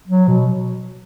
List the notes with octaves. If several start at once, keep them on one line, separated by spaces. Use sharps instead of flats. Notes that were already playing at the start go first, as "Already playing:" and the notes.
F#3
B2